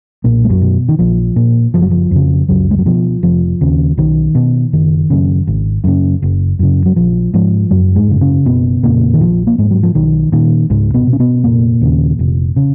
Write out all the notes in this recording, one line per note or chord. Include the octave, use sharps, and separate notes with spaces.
B1 A#2 A#3
G#3
F#2 F#3
B2
D#3
A#1 F3
A#2
F#1 F3
F#3
F3
F2 C#3
C#2 F#2 F#3
G#3
F#3
B2 F3
F1 F3
D#2 C#3
B1 D#3
B2
F#1 D#3
F#2 C#3
G#1
F#2 C#3
F#1
F#2 C#3
F#3
A#1 F3
G#2 F3
F#1 F#2 F#3
G#2 G#3
F#2 C#3
C#3 C#4
F#1 B2 B3
F2 A#2 C#3 A#3
D#3
A#1 F3
A#3
G#2 G#3
F#3
F3
B1 D#3
A#2 D#3
C#2 G#2 G#3
B2 B3
B2
C#4
B2 B3
F1 A#2 A#3
D#2 C#3
F1
C#3